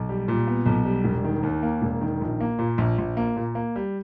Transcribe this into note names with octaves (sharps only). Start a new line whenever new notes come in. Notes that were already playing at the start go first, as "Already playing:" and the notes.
Already playing: B1
G3
A#2
B3
B1
G3
E1
D#3
D#2
A#3
E1
D#3
A#1
A#3
A#2
A#1
A#1
A#3
A#2
A#3
G3